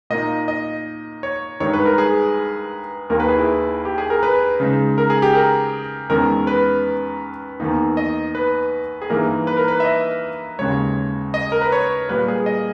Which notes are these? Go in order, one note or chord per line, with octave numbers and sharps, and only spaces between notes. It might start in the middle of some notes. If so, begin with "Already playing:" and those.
A#2 A#3 D#4 D#5
D#5
C#5
G2 D#3 G#3 D#4 C#5
B4
A#4
G#4
D#2 D#3 A#3 A#4
B4
G#4
E4
G4
G#4
A#4
B4
C#3 G#3 D#4
A#4
G#4
G4
A#4
E2 D#3 G#3 C#4 A#4
B4
E2 D#3 A#3 D#4
D#5
B4
G#4
G2 E3 A#3 D#4 A#4
B4
A#4
B4
E5
D#5
D#2 C#3 G#3 C#5
D#5
A#4
B4
C#5
A#2 G3 A#3 B4
G#4
D#5